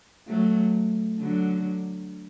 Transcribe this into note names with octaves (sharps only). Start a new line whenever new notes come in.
F#3 A3
D3 F#3